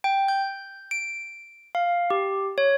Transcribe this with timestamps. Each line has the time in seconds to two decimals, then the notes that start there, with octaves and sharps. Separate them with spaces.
0.04 G5
0.28 G6
0.91 D7
1.75 F5
2.10 G4
2.58 C#5